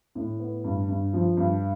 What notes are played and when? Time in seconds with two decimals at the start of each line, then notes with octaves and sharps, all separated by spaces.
0.15 A2
0.40 B3
0.64 G2
0.89 G2
1.13 F3
1.37 G2